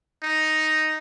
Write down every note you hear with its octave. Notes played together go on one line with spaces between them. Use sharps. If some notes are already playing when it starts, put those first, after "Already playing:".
D#4